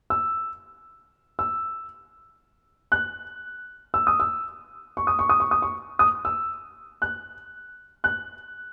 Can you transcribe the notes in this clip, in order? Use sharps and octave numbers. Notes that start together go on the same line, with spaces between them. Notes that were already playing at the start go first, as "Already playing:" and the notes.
E6
E6
F#6
E6
D#6
E6
C#6
D#6
C#6
D#6
C#6
D#6
C#6
D#6
E6
F#6
F#6